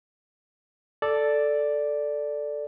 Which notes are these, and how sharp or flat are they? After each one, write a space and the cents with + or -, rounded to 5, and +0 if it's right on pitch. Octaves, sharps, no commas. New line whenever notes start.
A4 +0 D5 +0